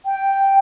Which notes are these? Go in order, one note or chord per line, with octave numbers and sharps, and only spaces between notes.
G5